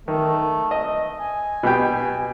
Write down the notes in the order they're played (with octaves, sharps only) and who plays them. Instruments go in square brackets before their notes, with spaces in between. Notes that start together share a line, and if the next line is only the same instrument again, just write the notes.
[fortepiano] D#3 [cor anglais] A3
[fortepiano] D#5
[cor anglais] G#5
[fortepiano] B2 G4 G5